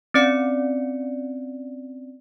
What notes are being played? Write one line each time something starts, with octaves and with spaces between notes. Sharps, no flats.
C4 C#4 D5 C#7